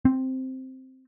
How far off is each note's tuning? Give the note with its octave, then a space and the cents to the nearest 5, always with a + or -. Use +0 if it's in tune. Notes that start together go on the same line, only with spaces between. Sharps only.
C4 +0